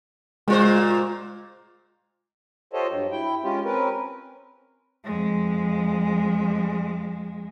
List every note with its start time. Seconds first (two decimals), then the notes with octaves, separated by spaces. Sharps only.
0.48 A#2 G#3 F4 C5
2.73 F4 G4 A4 C5 C#5 D#5
2.91 G2 F#3
3.11 E4 G5
3.44 G#3 C#4 F4 G4
3.65 C4 C#4 A#4 B4
5.04 F2 G#3